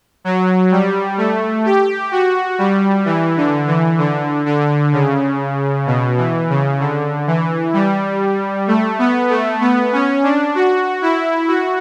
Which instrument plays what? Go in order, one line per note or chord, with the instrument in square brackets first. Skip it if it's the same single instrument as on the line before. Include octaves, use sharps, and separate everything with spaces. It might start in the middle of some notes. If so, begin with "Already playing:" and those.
[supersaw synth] F#3
G3
A3
G4
F#4
G3
E3
D3
E3
D3
D3
C#3
B2
E3
C#3
D3
E3
G3
A3
B3
A3
B3
C#4
D4
F#4
E4
F#4